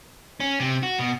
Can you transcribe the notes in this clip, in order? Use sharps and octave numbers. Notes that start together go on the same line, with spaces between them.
C#4
C3
F#4
B2